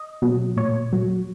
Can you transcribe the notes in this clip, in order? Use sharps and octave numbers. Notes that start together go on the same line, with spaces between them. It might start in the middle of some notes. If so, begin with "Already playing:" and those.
Already playing: D#5
B2 F#3
A#2 C#5
F#3